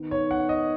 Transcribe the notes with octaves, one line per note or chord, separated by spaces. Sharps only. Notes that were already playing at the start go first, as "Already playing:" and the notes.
Already playing: D#3 B3 D#4
C#5
F#5
D#5